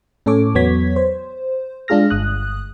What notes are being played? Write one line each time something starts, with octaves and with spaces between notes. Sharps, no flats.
A2 C#4 A4 C#5 D6
E2 F#3 B3 C#5 G#6 B6
C5
G#3 D4 F4 G#4 F6 A#6
G1 D#6 F#6